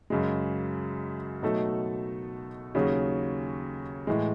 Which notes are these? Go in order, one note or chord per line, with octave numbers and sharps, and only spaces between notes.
F#2 C#3 G#3
B2 F#3 A3 D#4 A4
D#2 C#3 F#3 C#4 G#4
A2 E3 G#3